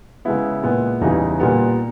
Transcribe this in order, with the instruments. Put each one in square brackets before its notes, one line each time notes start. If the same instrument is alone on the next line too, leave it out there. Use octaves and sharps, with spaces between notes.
[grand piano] C#3 G#3 B3 E4
A#2 G#3 B3
E2 C#3 E3 G3 D#4
A#2 G3 B3